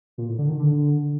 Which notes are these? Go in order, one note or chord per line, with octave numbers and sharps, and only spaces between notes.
A#2
A2
D3
D#3
D3